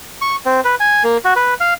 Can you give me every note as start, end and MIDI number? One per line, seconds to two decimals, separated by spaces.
0.21 0.36 85
0.46 0.60 60
0.65 0.75 71
0.80 1.03 80
1.04 1.17 58
1.25 1.34 66
1.36 1.54 71
1.60 1.74 77